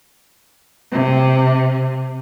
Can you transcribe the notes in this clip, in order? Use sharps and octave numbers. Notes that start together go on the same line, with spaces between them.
C3